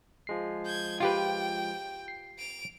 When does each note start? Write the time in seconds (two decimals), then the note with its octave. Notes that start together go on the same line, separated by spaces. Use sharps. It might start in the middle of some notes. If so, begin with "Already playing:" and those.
0.27 F3 G#3 C7
0.66 G6 G#6
1.00 F4 G4 B4 G5
2.08 C7
2.38 D7 F7